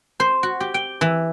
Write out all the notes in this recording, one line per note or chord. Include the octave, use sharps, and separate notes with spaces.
C5
F#4
G4
G5
E3